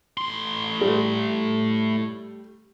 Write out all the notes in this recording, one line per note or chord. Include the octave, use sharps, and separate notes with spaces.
A2 C6
G3 A3